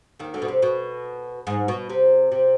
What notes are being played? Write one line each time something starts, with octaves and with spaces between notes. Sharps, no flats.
D#2 D#3
D2 D3
B2
C3
B2
G#2
B2
C3
C3